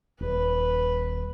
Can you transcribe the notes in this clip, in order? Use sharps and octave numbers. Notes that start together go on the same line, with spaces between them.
D#1 B4